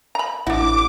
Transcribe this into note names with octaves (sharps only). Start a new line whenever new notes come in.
A#5 B5
A1 D4 E4 F#4 D6